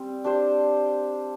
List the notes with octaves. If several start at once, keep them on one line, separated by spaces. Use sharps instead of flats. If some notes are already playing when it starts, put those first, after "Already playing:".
Already playing: G3 C4
D4 G4 C5